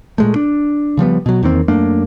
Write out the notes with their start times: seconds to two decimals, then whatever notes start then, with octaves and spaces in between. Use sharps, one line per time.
0.18 A#2 G#3 A3
0.36 D4
0.97 C#3 F3 G3 B3
1.26 B2 F#3
1.43 E2 D#3 A#3 C4
1.68 F#2 A3 A#3 D4